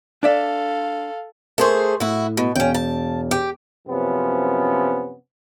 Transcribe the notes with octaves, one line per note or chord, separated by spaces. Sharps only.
D4 A4 D5 E5 F5
A3 G#4 A#4 C5 C6 C#6
A2 E4 F#4
B2
E1 C#4 F5 G5
A5
G4
F#2 C3 F3 B3 C#4